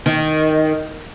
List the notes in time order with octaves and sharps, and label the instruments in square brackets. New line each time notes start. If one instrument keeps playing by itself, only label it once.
[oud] D#3